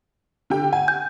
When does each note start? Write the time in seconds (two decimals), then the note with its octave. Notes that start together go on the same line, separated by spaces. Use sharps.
0.50 D3 G4 G5
0.73 F#5 G#5
0.88 G6